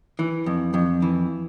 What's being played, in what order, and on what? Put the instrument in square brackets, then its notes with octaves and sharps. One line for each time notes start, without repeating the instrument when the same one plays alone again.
[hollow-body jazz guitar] E3
F2
F2
E3